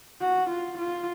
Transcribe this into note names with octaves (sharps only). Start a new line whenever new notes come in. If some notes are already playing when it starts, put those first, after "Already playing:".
F#4
F4
F4